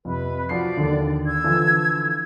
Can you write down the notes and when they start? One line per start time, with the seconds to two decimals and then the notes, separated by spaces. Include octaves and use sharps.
0.05 F2 C3 B4
0.49 F3 F#4 D5 C7
0.77 D#2 D3
1.26 E6 G#6
1.44 D3 E3 F3